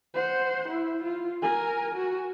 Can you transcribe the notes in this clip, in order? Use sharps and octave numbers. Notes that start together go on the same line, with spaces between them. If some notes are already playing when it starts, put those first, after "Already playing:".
C5 F#5
E4
F4
A#4 G#5
F#4